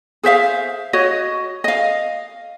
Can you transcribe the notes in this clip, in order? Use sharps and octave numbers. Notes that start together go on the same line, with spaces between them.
G#4 C5 E5 F5
F#4 C#5 D#5
D#5 F5